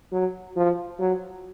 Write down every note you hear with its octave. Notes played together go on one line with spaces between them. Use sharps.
F#3
F3
F#3